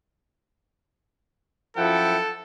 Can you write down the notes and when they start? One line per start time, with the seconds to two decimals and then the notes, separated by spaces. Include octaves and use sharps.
1.77 F#2 F3 E4 A4 F#5 G5